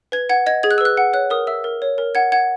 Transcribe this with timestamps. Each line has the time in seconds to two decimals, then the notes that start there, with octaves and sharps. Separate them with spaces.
0.12 B4 G#6
0.29 F#5 G#6
0.46 D#5 G#6
0.63 G#4 G#6
0.71 F#6
0.78 E6
0.81 B4 F#6
0.97 F#5
1.13 C#5 F#6
1.30 A#4 D#6
1.47 E5 E6
1.64 A#4
1.82 C#5
1.98 A#4
2.15 F#5 G#6
2.32 F#5 G#6